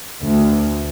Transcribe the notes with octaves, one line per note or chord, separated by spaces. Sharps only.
D2